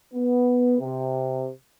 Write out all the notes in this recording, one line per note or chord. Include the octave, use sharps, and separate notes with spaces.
B3
C3